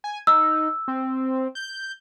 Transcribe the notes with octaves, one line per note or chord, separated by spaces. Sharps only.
G#5
D#4 E6
C4
G6